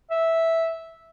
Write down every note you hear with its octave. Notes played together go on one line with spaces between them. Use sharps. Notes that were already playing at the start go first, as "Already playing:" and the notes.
E5